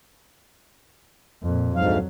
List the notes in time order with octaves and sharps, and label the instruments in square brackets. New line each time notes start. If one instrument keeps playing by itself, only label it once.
[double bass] F2 A#2
[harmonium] D2 G#2 F5 [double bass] F#3